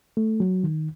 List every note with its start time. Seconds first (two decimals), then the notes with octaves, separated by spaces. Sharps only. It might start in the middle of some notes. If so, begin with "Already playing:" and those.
0.17 A3
0.40 F#3
0.64 D#3